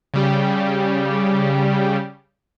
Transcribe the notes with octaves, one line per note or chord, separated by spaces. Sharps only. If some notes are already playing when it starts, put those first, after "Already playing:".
C#3 G3 G4